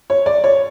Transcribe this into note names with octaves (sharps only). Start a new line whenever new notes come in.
C#5
D5
C#5